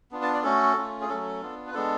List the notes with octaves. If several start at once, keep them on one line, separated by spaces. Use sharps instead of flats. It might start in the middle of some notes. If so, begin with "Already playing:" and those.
B3 D4 F4
A5
D5
A3 C#4 F#4 A4
A3 C#4 F4
G#4
F#3 A3 C#4 A4
B3 D4 F4
B4
G#3 B3 D4 A4